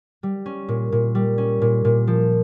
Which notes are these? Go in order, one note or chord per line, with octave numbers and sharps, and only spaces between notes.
G3
C#4
A#2
A#2
G3
C#4
A#2
A#2
F3